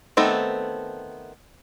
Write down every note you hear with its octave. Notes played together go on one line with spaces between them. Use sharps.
D#3 A3 B3 C4 A4